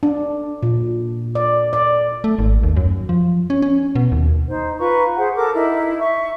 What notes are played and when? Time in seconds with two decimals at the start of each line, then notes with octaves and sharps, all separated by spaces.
0.03 D4
0.63 A#2
1.35 D5
1.73 D5
2.24 A3
2.39 G#1
2.63 D#2
2.76 F#2
3.09 F3
3.50 C#4
3.62 C#4
3.95 B2
4.12 D#2
4.49 D#4 C5
4.78 F4 B4 A#5 C#6
5.17 G#4 C5 F#5
5.36 A4 A#4 D6
5.55 D#4 E4
6.00 E5 C#6